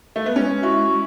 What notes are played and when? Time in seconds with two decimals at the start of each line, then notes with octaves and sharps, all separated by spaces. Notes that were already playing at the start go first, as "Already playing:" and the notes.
0.16 A3
0.26 B3
0.35 G#3 C#4
0.62 E4 F#4
0.89 G#3